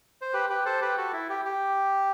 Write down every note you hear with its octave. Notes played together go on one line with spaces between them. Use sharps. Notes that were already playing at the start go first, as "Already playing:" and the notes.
C5
G4 B4
G4 B4
A4 C5
G4 B4
F#4 A4
E4
G4
G4